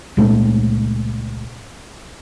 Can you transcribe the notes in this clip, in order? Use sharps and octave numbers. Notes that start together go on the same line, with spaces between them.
C#2 A#2 G#3 A3